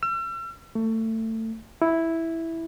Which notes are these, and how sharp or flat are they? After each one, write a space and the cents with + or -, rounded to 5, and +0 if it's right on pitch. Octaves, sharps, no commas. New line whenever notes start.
E6 +45
A3 +25
E4 -5